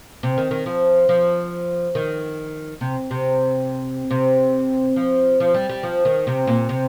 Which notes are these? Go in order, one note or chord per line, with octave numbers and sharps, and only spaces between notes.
C3
D#3
D#3
F3
F3
D#3
C3
C3
C3
F3
F3
G3
G3
F3
D#3
C3
A#2
C3